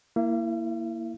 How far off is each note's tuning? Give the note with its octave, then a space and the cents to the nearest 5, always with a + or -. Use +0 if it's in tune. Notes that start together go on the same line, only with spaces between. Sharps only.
A#3 -5 E4 +0 F5 -45